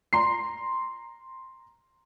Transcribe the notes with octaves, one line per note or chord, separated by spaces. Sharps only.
A#5 C6 C7